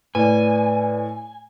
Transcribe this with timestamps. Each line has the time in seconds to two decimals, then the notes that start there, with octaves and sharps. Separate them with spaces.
0.15 A2 B4 D5 G#5